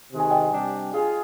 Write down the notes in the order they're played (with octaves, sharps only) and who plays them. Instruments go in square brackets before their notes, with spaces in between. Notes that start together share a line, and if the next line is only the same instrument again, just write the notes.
[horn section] C3 D#3 G#3
[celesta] G#5
D#5 G5
[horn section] C3 G3 D4
F4 G#4